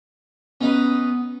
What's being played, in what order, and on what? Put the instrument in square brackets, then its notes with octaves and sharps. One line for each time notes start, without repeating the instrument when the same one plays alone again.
[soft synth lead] B3 [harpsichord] C#4 D#4 B4